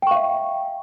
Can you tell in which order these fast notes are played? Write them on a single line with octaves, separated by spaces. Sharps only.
G5 C#6 F5 E5